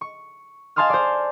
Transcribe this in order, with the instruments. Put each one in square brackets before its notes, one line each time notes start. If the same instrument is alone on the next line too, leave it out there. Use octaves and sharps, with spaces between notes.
[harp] C#6
F5 G#5 A5 C6 D#6 F6
C5 D5